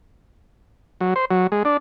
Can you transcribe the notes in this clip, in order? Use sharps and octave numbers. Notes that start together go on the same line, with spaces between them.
F#3
C5
F#3
G#3
D4